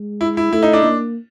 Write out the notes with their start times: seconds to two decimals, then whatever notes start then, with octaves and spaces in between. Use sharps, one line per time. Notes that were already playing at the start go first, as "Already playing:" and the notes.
Already playing: G#3
0.21 E4
0.37 E4
0.52 A3 E4
0.63 D#4
0.73 D4
0.84 A#3